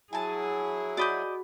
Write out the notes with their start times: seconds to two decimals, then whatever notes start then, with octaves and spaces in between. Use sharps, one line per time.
0.13 F#3 E4 G#4 G#5 A5
0.97 F#4 D5 D#5 B5 G6